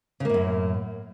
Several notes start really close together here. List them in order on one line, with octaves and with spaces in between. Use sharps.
C#3 A#3 A2 F#2